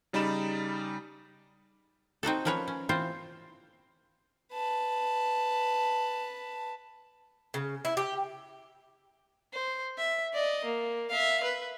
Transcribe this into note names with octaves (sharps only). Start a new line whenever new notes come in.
C#3 G3 D#4 D5 B5 E7
C4 D#4 F#4 A4
F3 C#4 A#4 B4 C#5
C#4
E3 C4 F4 C5
B4 A5
C#3
E4
G4
C5
E5
D5 D#5
A#3
E5 F5
B4